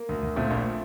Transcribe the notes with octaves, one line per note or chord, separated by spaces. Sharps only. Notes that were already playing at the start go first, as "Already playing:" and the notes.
Already playing: A#3
D2
D2
A#2 A3 C4
A#1